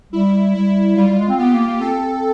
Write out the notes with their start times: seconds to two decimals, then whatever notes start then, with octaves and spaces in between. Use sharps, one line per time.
0.12 G3 E4
0.55 G3 E4
0.96 G3 F4
1.08 G3
1.18 G#3
1.29 C4
1.39 B3 G4
1.53 A#3
1.67 A#3
1.80 C4 A4